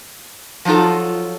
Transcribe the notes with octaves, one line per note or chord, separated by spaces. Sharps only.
F3 F#3 D#4 F4 A4